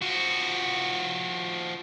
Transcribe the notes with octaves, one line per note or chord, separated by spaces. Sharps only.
F3 F#4